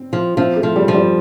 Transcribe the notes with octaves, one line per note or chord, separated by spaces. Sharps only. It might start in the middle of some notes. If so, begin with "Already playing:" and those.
Already playing: C4
F3
F3 C4
A3
F3
G3
F3
G3